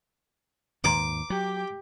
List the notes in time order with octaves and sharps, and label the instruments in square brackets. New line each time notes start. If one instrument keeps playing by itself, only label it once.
[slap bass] D#2 G#2 D#3 [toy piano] B4 A#5 C6 [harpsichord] D6
[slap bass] F#3 [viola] G4 G5